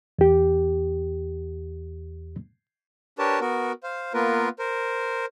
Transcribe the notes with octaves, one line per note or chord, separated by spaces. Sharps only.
E2 G4
D4 G4 A#4 B4 C#5 A5
B3 F#4 A#4
C5 F5
A#3 B3 F4 A#4 B4
A#4 C5